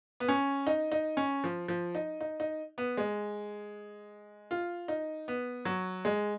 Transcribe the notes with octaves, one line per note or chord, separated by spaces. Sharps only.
B3
C#4
D#4
D#4
C#4
F3
F3
D#4
D#4
D#4
B3
G#3
F4
D#4
B3
F#3
G#3